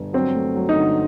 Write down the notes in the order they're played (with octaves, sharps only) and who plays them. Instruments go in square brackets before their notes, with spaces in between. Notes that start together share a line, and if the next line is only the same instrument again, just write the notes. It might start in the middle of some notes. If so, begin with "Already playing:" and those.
Already playing: [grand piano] G1
[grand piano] F#3 [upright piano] C4
[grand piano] A3
F#3
[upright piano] D#4
[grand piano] D3